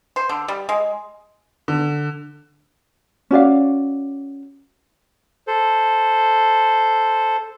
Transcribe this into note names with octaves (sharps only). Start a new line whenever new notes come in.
C5
D3
G3
G#3
D3
C#4 F#4 D5 F5
A4 C5